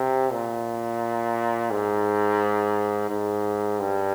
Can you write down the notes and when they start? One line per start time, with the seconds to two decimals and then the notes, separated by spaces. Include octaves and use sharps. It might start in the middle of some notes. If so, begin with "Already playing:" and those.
Already playing: C3
0.32 A#2
1.71 G#2
3.10 G#2
3.80 G2